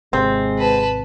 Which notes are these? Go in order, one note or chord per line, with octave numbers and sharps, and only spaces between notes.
G#1 C3 G#3 C4
B4 A5